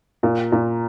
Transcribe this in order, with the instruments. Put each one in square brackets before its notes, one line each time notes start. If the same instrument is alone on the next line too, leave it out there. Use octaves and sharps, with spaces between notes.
[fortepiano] A#2
A#2